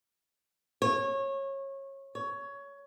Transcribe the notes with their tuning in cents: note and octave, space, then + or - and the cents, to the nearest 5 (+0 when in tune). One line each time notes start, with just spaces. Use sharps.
C#5 -25
C#5 +15